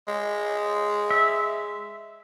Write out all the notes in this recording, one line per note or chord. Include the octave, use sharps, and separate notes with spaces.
G#3
E5